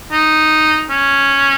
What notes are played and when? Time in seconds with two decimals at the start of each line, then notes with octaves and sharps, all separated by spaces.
0.12 D#4
0.90 C#4